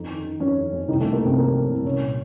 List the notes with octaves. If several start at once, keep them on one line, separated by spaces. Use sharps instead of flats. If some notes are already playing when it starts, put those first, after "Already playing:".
Already playing: F2 D#4
D#3
D#3
F2 C#4 C#5
D#3
F2
C2 D#3 D#4
A3
C2
A#3
C2 C3 C4
F3 A#3 A#4
F3
C2
C2 C#4 C#5
A#2